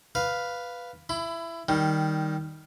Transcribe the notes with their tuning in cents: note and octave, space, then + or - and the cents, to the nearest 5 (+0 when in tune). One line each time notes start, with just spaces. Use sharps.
B4 +0 F5 +0
E4 +20 B5 +35
D#3 +0 G3 +0